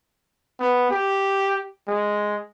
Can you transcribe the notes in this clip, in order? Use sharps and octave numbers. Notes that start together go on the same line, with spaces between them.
B3
G4
G#3